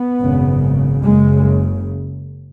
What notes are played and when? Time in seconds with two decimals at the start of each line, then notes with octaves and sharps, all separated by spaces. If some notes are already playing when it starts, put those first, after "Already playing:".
Already playing: B3
0.19 G#1 F#2 C#3
1.03 F#1 F#2 C#3 G#3